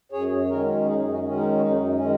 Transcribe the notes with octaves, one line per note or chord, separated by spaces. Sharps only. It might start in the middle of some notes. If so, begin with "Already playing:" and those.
F#2 G#4 C#5
C#5
D#3 G#3 C#4 F#4 A#4
F#2 D#4 G#4
C#4 F#4
D#3 G#3 C#4
D#4
F#4
F#2 D#4
D#3 G#3 C#4